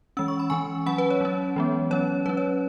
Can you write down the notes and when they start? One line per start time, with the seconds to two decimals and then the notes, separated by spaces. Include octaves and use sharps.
0.17 E3 G#3 C#4 E6
0.28 C#6
0.39 B5
0.50 E3 C#4 G#5 C#6
0.86 F#3 C#4 F#5 B5
0.98 B4
1.10 C#5
1.21 F#3 C#4
1.56 E3 G#3 B3
1.91 F#3 C#4 C#5
2.26 F#3 C#4 B4
2.37 C#5